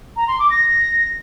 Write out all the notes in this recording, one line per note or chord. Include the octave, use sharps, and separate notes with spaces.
A#5
C6
D6
A#6